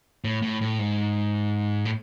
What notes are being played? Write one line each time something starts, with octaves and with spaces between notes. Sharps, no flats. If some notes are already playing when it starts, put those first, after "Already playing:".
A2
A2
A2
G#2
A2